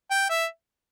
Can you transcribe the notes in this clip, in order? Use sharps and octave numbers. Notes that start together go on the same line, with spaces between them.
G5
E5